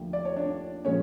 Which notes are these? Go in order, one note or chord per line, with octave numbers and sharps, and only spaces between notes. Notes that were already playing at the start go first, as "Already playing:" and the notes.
Already playing: D#2 D3 F3 A3
D5
C#5
D4 D5
A#2 F3 G#3 C#4 C#5